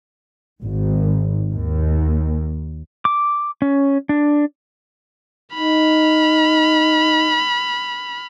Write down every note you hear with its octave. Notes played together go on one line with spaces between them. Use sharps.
G#1
D#2
D6
C#4
D4
D#4 B5 F6